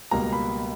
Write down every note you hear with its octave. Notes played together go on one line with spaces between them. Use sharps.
C#2 B2 G3 A#3 A#5
B5